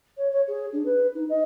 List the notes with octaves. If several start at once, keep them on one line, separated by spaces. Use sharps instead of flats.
C#5
C#5
G#4
D4
B4
D#4
D#5